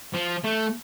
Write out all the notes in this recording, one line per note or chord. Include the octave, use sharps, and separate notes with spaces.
F3
A3